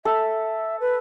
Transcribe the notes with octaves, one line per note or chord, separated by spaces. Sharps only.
A4 E5
B4